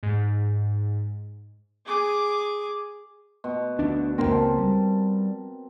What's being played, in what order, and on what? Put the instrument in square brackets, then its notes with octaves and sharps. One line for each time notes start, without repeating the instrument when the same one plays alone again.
[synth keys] G#2
[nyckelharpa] G#4 D6
[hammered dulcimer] B2
[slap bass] D2 D4
[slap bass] C#2 F#2 A#3 [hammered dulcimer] C4 A#4
[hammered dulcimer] A5
[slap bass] G3